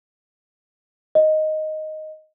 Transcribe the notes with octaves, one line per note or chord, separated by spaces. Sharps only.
D#5